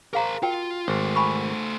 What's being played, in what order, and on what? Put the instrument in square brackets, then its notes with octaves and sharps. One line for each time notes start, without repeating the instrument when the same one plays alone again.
[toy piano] G#4 F5 A#5 [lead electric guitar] A#4 C5
[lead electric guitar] F4 [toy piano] F#4 A#4 G5
[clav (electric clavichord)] G#1 [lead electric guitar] A3 C5
[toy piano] G#5 B5 C#6